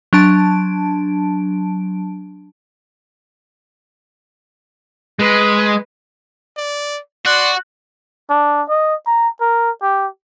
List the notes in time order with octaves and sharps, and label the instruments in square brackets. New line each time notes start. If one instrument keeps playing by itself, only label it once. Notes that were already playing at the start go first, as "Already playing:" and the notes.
[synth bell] F#3 D4 A5 D7
[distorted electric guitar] G#3 [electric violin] B4
[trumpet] D5
[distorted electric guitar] F#4 [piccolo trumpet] D5 [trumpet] C6 [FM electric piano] F#6
[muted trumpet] D4
D#5
A#5
A#4
G4